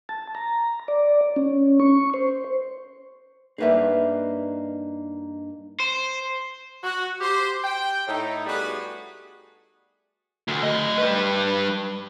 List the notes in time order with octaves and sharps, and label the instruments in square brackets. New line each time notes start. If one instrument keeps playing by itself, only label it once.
[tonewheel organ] A5
A#5
D5
C#4
C#6
C5
[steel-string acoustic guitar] G2 A#3 D#4 [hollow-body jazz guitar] G#4 B4 E5
[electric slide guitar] C5
[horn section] F#4
G4 C5
G5
A2 D#4
G3 A3 B3 F#4 G#4 B4
[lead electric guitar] D2
A3 D#5
G3 B4